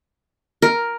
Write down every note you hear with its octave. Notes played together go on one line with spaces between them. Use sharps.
A#4